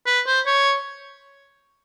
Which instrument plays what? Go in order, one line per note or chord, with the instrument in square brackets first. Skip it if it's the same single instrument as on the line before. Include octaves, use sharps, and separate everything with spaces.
[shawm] B4
C5
C#5